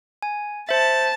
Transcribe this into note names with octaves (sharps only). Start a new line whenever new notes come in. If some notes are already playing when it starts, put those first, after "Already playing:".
G#5
C5 E5 A5